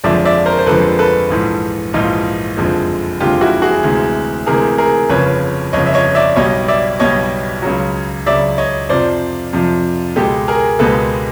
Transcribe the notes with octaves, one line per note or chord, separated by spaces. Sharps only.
G1 F2 D3 F3 G#3 D5 E5
D5 E5
A#4 C5
C5
G1 F2 D3 F3 G#3 A4 B4
A4 B4
A#1 G#2 E3
A#1 G#2 E3 D#4 F4
F#1 F2 D3 F3 G#3
F#1 F2 D3 F3 G#3 F4 G4
E4 F#4
F#4 G#4
D2 C3 E3 G#3
D2 C3 E3 G#3 G#4 A#4
G#4 A#4
G1 F2 C#3 B4 C#5
G1 F2 C#3 C#5 D#5
E5
C#5 D#5
D5 E5
B1 B2 G3 C#5 D#5
D5 E5
B1 B2 G3 C#5 D#5
C#2 C#3 F#3
C#2 C#3 F#3 D5 E5
C#5 D#5
F2 C3 F3 C5 D5
F2 C3 F3
C#2 B2 G#3 G4 A4
G#4 A#4
C#2 B2 G#3 A4 B4